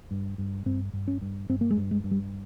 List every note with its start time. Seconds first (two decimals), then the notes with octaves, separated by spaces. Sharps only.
0.11 G2
0.38 G2
0.66 G2 C4
0.93 G2
1.08 C#4
1.22 G2
1.49 G2 C4
1.61 A#3
1.71 G#3
1.77 G2
1.91 G#3
2.04 G2
2.11 G3